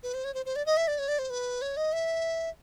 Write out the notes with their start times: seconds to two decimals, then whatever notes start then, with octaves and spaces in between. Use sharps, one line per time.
0.03 B4
0.14 C5
0.24 C#5
0.34 C5
0.46 C5
0.56 D5
0.66 D#5
0.77 E5
0.88 D5
0.99 C#5
1.08 D5
1.19 C5
1.30 B4
1.62 C#5
1.77 D#5
1.93 E5